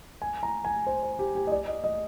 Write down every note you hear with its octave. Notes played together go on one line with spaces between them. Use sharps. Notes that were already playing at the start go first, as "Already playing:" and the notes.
G#5
A#5
G#5
C5
C5
G4
G4
D#5
D5
D#5
D#5